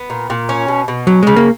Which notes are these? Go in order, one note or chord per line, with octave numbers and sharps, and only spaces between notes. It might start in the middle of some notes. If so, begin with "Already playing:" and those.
Already playing: B3
A#2
A#2
C#4
B2
B2
F#3 C#4
C#3 G#3
A#3